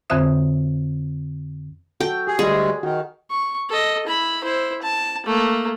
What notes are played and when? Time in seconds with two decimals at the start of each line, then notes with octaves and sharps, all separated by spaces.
0.10 F2 D3 C4 C5 E5 D#6
2.00 F#4 A4 G5
2.27 G4 G#4
2.39 D2 G3 G#3 G#4
2.83 D#3 F#4
3.30 C#6
3.69 A4 D#5
4.07 E4 B5
4.44 E4 C5
4.82 A5
5.26 A3 A#3